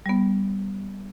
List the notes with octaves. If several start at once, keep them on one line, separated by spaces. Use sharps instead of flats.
G3 B3